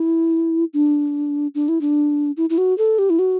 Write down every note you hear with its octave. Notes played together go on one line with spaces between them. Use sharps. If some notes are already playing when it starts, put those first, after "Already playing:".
Already playing: E4
D4
D4
E4
D4
E4
E4
F#4
A4
G4
E4
F#4